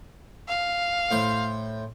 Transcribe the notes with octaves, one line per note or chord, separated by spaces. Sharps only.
F5
A2 C5